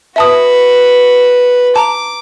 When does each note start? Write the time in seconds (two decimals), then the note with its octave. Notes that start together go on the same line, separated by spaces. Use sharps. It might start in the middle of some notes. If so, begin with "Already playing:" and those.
0.16 F#4 B4 E5 A5 D#6
1.76 A5 A#5 D6